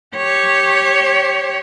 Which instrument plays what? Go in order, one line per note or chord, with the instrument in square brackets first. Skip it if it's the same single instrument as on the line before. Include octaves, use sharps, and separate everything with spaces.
[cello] G4 C#5